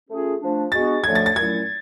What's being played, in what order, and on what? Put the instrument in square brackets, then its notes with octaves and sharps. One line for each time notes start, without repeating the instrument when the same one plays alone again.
[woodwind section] A3 C#4 F4 G#4
F3 A3 D4
[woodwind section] G#3 B3 D4 F#4 [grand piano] A6
[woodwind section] D3 F3 A3 C#4 [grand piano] G#6
[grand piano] A6
A6
[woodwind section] A#2 F#3 A3 C#4 E4 [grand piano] G#6